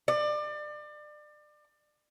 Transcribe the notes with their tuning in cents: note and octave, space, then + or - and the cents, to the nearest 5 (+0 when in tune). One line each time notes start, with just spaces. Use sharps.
D5 +30